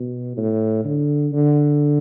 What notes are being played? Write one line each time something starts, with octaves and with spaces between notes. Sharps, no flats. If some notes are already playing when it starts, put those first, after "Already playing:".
Already playing: B2
A2
D3
D3